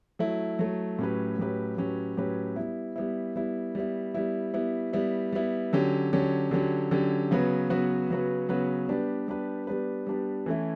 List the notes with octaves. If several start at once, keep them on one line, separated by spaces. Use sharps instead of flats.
F#3 A3 E4
F#3 A3 E4
A2 F#3 C#4 G4 B4
A2 F#3 C#4 G4 B4
A2 F#3 C#4 G4 B4
A2 F#3 C#4 G4 B4
G3 B3 E4
G3 B3 E4
G3 B3 E4
G3 B3 E4
G3 B3 E4
G3 B3 E4
G3 B3 E4
G3 B3 E4
D3 F#3 C#4 G4
D3 F#3 C#4 G4
D3 F#3 C#4 G4
D3 F#3 C#4 G4
C#3 F#3 B3 F#4 B4
C#3 F#3 B3 F#4 B4
C#3 F#3 B3 F#4 B4
C#3 F#3 B3 F#4 B4
G3 B3 D4 G4 B4
G3 B3 D4 G4 B4
G3 B3 D4 G4 B4
G3 B3 D4 G4 B4
E3 A3 C#4 E4